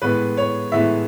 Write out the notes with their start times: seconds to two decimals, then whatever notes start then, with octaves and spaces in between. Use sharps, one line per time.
0.02 A2 E3 G#3 B3 B4
0.37 C#5
0.72 A2 E3 G#3 B3 E5